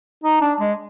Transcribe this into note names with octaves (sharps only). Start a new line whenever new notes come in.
D#4
D4
G#3